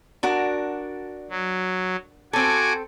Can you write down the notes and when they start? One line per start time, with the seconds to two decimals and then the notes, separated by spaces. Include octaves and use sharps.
0.23 D4 F#4 A#4
1.30 F#3
2.33 C4 F#4 A4 G#5 D6